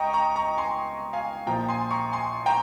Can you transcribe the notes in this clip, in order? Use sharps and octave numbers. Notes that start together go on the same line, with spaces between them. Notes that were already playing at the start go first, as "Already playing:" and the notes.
Already playing: C#2 D#5 G5 A#5 C#6
A#5 C#6
A#5 C#6
G#5 C6
F5 G#5
A#1 A#2 F3 G5 A#5
G#5 C6
A#5 C#6
G#5 C6
G5 A#5